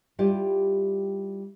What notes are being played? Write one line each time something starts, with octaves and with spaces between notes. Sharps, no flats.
G3 E4 F4 G4